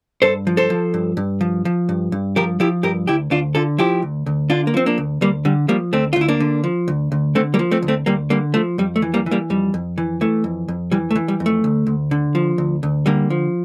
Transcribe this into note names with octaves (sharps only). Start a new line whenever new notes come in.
G2 A4 C5
F3
A4 C5
F3
G2
G2
F3
F3
G2
G2
F3 G4 A#4
F3 E4 G4
G2 G4 A#4
D2 E4 G4
D2 D4 F4
D3 F4 A4
F3 E4 G4
D2
D2
D3 D4 F4
A#3
F3 C4
A#3 D4
D2
D2 G3 A#3
D3 G3
F3 G3 A#3
D2 A3 C4
F4
D2
E4
A#3 D4
D3
F3
D2
D2
D3 A3 C4
G3 A#3
F3
A3 C4
D2
A3 C4
D2 G3 A#3
D3 G3 A#3
F3 A3
F2 G3
A3
E3
G3 A#3
E3
G3 A#3
F2 G3
F2
E3
E3 A3
F2
F2
E3 G3
A3
E3
G3
F2
A3
D2
D2
D3
F3
D2
D2
D3 G3 A#3
F3